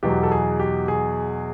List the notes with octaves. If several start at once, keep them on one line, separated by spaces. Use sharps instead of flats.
E2 B2 F#3 G4
A4
G#4
G4
G#4